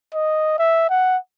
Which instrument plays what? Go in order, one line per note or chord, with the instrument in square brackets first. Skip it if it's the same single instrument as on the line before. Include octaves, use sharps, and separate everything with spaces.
[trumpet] D#5
E5
F#5